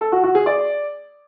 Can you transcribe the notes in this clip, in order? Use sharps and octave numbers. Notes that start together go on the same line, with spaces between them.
A4
F#4
F#4
G#4
D5